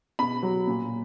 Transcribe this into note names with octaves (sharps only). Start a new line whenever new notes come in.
B2 B5
F#3
A#2